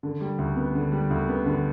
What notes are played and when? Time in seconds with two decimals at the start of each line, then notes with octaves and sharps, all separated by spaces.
0.03 D3
0.21 G3
0.38 D2
0.56 B3
0.75 D3
0.92 G3
1.10 D2
1.29 B3
1.46 D3